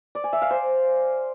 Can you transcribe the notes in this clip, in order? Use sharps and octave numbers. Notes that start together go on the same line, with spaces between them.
D5
G#5
E5
F5
C5